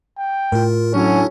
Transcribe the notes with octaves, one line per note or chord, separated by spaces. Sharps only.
G5
A2 F4 A#4
F#3 C#4 D4 E4 A4